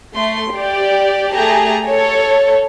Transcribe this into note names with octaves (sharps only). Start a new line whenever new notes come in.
A3 C6
G4 D5
A3 G4 G#4 A5 A#5
A4 C#5